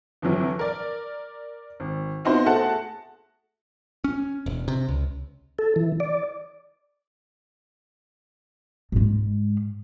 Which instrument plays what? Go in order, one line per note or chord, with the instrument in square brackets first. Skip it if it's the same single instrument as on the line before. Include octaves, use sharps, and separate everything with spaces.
[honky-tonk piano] G1 F2 E3 F#3
A#4 D5
G#1
B3 C4 D#4 E4 F#4 C5
A3 F#4 G#4 F#5 A5
[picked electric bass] C#4
E1
C3
C#2
[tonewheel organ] A4
E3
D5
[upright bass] G#2 G#3